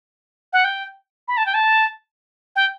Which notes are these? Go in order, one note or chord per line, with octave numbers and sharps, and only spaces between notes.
F#5
G5
B5
A5
G5
A5
G5